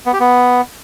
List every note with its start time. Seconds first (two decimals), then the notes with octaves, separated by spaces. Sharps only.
0.06 B3
0.13 G4
0.20 B3